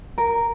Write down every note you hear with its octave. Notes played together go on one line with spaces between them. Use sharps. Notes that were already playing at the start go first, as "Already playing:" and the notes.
A#4